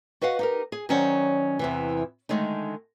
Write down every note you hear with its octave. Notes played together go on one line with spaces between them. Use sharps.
F#4 B4 D#5 F5 F#5
D#4 G4 A#4
G#4
D#3 F#3 C#4 C5 D5 F#5
E2 C3 E3
D3 D#3 G#3 A3 D#4